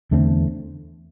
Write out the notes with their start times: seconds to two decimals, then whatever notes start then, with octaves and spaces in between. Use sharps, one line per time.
0.11 E2 D3 A3 C4